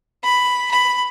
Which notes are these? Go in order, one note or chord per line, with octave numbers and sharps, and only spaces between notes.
B5
B5